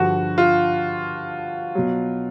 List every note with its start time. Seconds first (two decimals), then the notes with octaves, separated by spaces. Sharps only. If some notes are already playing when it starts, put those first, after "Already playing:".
Already playing: G2 D3 F3 F#4
0.38 F4
1.75 B2 F#3